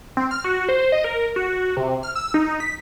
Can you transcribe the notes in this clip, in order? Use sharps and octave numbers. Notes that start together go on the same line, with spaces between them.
C4
F6
F#4
C5
D#5
A#4
F#4
C3
F6
E6
D#4
B6